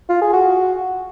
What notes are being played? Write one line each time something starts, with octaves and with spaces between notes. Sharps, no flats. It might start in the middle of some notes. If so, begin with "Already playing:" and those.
F4
G#4
F#4